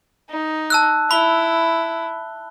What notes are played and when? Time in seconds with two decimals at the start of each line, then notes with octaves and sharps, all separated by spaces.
0.30 D#4
0.70 A5 E6 F#6
1.11 E4 B5 G7